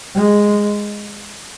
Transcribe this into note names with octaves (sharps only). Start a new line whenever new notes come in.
G#3